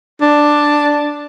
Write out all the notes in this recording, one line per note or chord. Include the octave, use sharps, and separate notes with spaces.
D4